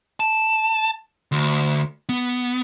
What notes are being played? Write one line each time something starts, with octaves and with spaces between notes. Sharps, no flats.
A5
D2
B3